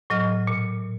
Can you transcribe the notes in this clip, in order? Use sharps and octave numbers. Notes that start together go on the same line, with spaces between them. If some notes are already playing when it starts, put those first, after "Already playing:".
A2 F#3 D#5 F6
A#2